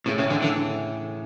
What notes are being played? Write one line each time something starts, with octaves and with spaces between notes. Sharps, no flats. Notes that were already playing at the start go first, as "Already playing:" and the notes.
A2 C#3
A2 C#3
D3 E3
D3 E3